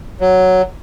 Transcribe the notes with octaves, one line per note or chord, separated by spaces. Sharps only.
F#3